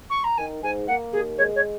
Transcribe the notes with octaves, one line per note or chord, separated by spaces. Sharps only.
C#6
A#5
D#3 G#5
G#2 G#5
A#3 F#5
D#2 G#4
G#3 C#5
C#5